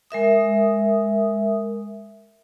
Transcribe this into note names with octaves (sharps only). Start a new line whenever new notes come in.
G#3 A#4 E5 D#6